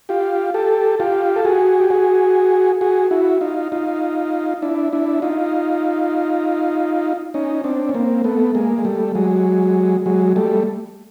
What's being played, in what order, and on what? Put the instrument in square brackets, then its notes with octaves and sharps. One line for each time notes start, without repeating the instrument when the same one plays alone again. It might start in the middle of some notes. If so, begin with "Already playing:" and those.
[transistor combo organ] F4 G4
G4 A4
F4 G4
A4
F#4 G#4
G4
F#4 G#4
F#4 G#4
E4 F#4
D#4 F4
D#4 F4
D4 E4
D4 E4
D#4 F4
C#4 D#4
C4 D4
C#4
A#3 C4
A3 B3
G#3 A#3
G#3
G3 A3
F#3 G#3
F#3 G#3
G3 A3